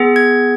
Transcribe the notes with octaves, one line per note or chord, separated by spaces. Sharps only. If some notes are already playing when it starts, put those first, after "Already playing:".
Already playing: B3 G#4
G#6